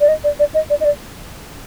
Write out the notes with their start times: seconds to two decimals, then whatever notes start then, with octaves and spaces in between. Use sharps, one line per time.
0.01 D5
0.08 D#5
0.24 D5
0.39 D5
0.54 D#5
0.70 D5
0.80 D#5
0.84 D5